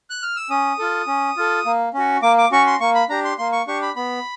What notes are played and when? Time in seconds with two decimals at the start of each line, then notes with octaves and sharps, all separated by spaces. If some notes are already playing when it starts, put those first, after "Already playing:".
0.10 F#6
0.22 F6
0.36 E6
0.50 C#4 D#6
0.79 F4 A4
1.07 C#4
1.37 F4 A4
1.66 A#3
1.94 C#4 F#4
2.22 A#3 D6
2.38 D6
2.52 C#4 F#4 C#6
2.67 C6
2.80 A#3 C#6
2.95 B5
3.09 D4 G4 A#5
3.24 C6
3.38 A#3 C6
3.52 C#6
3.67 D4 G4 C#6
3.82 B5
3.96 B3 B5